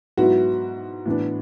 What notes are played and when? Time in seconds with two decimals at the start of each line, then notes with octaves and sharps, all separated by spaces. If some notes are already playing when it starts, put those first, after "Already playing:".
0.17 G#2 F#3 B3 E4 F#4
1.06 A2 E3 B3 D4